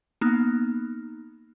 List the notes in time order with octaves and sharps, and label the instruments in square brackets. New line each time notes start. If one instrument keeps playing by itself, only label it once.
[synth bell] A#3 B3 D#4